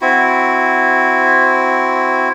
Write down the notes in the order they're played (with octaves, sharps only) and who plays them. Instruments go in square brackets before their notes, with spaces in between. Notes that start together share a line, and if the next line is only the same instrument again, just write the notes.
[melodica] C4 E4 F#4